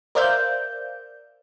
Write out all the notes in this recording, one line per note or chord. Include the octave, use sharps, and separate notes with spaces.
A#4 C5 D5 E5 F5 G6